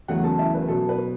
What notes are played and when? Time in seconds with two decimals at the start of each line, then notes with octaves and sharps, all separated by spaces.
0.08 E2 C#3 F#3 A3 F#4 F#5
0.24 A4 A5
0.39 E4 E5
0.54 B4
0.68 B2 F#3 B3 A4
0.89 B4